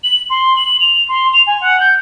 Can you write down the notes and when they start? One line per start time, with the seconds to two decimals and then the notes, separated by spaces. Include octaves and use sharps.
0.04 F#7
0.30 C6
0.56 F#7
0.80 F7
1.08 C6
1.33 F7
1.47 G#5
1.61 F#5
1.80 G6